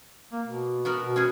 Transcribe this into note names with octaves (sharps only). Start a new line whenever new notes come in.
A#3
B2
B3 F#4 A#4
B2
C#4 F#4 G#4